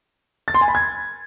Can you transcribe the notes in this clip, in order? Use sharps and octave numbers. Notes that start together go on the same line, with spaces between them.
A6
C6
G#5
B5
G#6